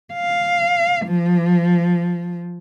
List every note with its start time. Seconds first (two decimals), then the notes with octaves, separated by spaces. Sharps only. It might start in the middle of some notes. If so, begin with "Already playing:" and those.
0.14 F5
1.05 F3